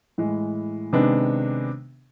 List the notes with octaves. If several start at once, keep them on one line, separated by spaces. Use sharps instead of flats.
A2 E3 G#3
C3 D#3 G#3 B3 D4